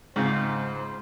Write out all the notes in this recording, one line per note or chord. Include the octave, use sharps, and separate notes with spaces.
G#2 C#3 G#3 C4 F4 C5